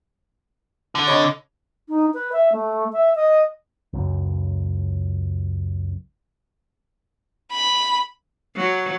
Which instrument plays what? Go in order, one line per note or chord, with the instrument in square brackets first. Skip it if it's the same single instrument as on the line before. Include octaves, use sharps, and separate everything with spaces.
[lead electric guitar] D3
[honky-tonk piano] C#5 D#5 B5
[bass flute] D#4
B4
E5
A3
E5
D#5
[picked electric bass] C#2 F#2
[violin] B5
[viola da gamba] F#3